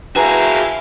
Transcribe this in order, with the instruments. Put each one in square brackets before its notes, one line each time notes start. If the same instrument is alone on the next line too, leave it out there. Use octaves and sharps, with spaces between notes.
[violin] E4 F5 [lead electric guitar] F#4 G#4 [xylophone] B4 [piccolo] A#5